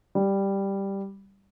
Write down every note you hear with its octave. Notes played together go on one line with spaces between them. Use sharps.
G3